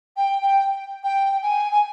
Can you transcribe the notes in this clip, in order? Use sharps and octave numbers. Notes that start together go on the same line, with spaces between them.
G5
G5
G5
G#5
G#5